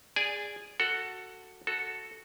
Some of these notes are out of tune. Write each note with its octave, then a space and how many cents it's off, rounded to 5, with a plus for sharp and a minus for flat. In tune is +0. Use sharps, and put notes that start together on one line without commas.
G#4 -15 D5 +0 G#5 +0
F#4 +0 A4 +15 F#5 +0
F#4 -5 A4 +0